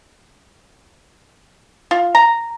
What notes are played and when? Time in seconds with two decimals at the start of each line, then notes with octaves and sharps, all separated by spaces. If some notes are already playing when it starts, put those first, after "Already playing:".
1.91 F4
2.15 A#5